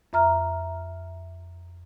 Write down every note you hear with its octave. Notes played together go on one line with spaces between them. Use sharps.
F2 E5 A#5 F6